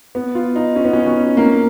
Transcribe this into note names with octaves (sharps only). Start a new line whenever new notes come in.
B3
F4
D#4
C#4
B3
C#4
C#4
A#3